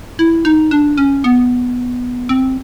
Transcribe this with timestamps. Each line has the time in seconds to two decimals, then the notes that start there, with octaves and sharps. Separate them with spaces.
0.19 E4
0.45 D#4
0.71 D4
0.97 C#4
1.24 B3
2.29 C4